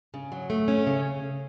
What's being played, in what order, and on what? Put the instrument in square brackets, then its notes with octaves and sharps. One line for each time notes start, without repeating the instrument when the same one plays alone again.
[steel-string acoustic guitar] C#3
F#3
A3
C#4
C#3